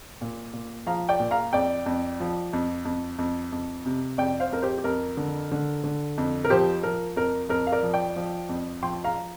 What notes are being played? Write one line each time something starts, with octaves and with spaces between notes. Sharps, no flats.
A#2
A#2
F3 F5 A#5
D5 G5
A#2
F5 A#5
F2 D5 G5
F2
F3
F2
F2
F2
F2
C3
F2 D5 G5
C5 F5
F2 A#4
G4 C5
G4
F2 A#4
D3
D3
D3
F2
A#4
F3 G4 C5
F3 A#4
F2 A#4
F2 A#4
F5
A#4 D5
F3
D5 G5
F3
F2
F3 G5 C6
F5 A#5